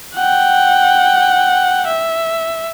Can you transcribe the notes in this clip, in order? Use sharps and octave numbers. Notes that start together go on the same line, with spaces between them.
F#5 G5
E5